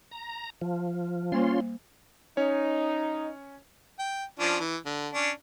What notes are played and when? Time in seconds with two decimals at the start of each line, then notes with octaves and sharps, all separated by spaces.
0.11 A#5
0.61 F3
1.32 G3 A#3 C#4 F4 C5 C6
2.37 C#4 D#4 C#5
3.99 G5
4.40 F3 C#4 D4
4.60 E3
4.86 D3
5.13 C#4 D4